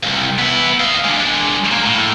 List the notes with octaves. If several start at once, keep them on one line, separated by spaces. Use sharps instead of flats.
C2 G2
B3 E4
D#4 F5
G#3 D4
A#3
A2